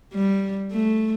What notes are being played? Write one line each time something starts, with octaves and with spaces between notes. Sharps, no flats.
G3
A3